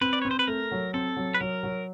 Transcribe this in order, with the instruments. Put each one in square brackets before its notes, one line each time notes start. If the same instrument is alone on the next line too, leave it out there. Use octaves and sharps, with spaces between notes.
[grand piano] C4 [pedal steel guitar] B4
[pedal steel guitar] D5
[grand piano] C4 [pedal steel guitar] C#5
[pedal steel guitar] C5
B4
[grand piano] A3 [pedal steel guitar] A#4
[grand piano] F#3
[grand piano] C4 [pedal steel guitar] A4
[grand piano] F#3
[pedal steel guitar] B4
[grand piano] F#3 [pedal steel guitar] A#4
[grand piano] F#3